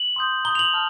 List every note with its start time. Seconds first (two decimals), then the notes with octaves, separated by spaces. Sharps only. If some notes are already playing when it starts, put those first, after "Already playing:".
Already playing: F#7
0.16 C6 D#6 G6
0.45 A#5 D#6 G6 G7
0.55 F7
0.59 F#7
0.74 A5 F6